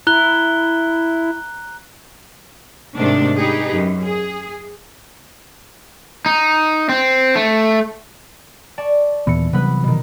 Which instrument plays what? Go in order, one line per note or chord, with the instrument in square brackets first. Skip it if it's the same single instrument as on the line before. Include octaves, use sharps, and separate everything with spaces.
[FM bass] E4 [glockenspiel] A#5 F#6 G7
[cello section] G#2 C3 D#3 A3 D4
D#4 G4 G#4 B4
F#2
G#4
[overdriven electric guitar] D#4
C4
A3
[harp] D5 A5 C#6
[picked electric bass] D#2 A#2 B3 [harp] E3 C#7
[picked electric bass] C3 F#3 G3 [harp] B3 B4
[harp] B2 D#3